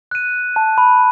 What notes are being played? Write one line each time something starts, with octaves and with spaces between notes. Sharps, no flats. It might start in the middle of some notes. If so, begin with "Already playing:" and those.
F#6 D#7
A5
B5